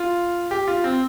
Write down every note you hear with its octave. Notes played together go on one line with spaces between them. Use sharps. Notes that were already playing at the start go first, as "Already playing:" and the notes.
Already playing: F4
G4
F4
C4